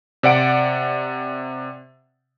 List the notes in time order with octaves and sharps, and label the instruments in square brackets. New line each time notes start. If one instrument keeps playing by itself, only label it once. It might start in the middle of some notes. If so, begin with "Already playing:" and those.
[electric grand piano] C3 D5 F#5 D7